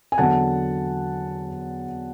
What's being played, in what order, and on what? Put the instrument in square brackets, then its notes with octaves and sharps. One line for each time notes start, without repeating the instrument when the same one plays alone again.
[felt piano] G#5
E2 D3 F#3 F#5 A5